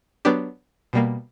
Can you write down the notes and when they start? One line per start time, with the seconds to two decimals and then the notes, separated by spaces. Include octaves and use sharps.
0.25 F#3 B3 D4 G4
0.93 B2 G3 A#3